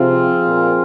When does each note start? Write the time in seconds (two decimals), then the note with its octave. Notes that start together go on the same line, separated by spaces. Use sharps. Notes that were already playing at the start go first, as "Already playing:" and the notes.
Already playing: C3 F3 C4 F4 G#4
0.46 A#2